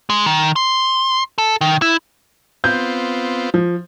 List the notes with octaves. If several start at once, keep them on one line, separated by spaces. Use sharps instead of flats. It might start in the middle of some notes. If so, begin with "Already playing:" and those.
G#3
D#3
C6
A4
D#3
E4
B3 C4 F4 G6
F3